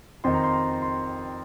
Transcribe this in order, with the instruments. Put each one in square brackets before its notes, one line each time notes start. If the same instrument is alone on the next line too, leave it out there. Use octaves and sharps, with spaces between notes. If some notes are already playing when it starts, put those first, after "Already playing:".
[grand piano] F2 D#3 C6
A#5
C6
A#5
C6